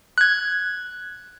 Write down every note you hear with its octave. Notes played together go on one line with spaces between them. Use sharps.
F#6 G#6